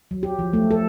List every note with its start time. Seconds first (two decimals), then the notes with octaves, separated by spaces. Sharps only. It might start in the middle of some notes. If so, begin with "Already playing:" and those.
0.11 F#3
0.23 G4
0.39 F3
0.53 A3
0.71 A4